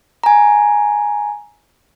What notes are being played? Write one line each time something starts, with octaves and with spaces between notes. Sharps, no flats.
G#5 A#5